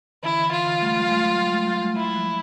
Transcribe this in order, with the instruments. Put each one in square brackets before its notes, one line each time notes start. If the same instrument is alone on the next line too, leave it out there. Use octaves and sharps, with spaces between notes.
[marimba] D3 E3 [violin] E4
[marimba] D3 E3
[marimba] D3 E3 [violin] F4
[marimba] D3 E3
G3 A3
F#3 G#3
G3 A3
F#3 G#3
F#3 G#3
G3 A3
F#3 G#3
G3 A3
[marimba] F#3 G#3 [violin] E4
[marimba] F3 G3